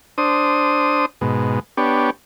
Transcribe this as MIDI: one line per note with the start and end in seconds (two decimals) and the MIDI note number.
0.18 1.06 62
0.18 1.06 72
0.18 1.06 87
1.21 1.59 44
1.21 1.59 47
1.77 2.10 59
1.77 2.10 62
1.77 2.10 67
1.77 2.10 73